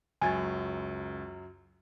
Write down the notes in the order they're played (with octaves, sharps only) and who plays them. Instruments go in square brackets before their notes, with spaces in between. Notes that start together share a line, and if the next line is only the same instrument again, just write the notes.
[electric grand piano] C#2 [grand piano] F#2 F#3 [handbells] G#5 G#6 A6